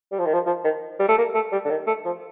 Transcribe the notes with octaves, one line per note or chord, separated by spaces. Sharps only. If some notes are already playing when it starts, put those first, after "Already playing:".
G3
F3
D#3
F3
F3
D#3
G3
A3
A#3
A3
G3
D3
D#3
A3
F3